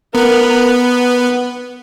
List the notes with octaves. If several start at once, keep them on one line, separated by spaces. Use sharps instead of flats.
B3 A#4